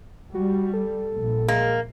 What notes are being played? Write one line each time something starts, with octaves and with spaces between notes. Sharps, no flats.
G3 F#4
A4
A#1
G#3 A#3